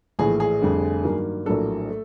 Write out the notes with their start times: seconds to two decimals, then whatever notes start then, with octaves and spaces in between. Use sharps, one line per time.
0.19 A#1 A2 E3 G#4
0.40 G#4
0.61 F1 F2 D3 G3
1.04 G2 D#3 F#3 A#3
1.46 A#1 A2 F#3 A#3 D4 A4
1.89 A3